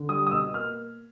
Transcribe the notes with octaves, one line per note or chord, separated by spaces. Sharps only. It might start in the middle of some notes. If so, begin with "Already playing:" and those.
Already playing: D3
G3 D#6
D#6
B2 E6
A#3 F6